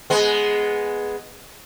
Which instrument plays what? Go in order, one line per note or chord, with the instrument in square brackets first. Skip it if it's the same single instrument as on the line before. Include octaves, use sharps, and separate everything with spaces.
[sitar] G#3 B3